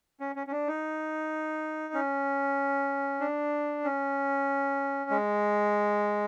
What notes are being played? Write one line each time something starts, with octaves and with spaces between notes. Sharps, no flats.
C#4
C#4
C#4
D4
D#4
C#4
D4
C#4
G#3